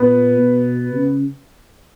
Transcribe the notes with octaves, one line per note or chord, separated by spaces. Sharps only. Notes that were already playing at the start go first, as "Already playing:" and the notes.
Already playing: A#2 B3 B4
B2
C#3